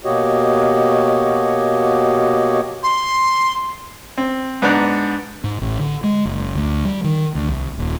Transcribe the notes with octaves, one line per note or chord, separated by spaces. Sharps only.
B2 A#3 F#4 G4 C#5 D#5
C6
C4
G#2 B3 D4 A#5 F#6
G#2
A1
D3
G#3
F#1
D2
G3
D#3
D2
C2
D#1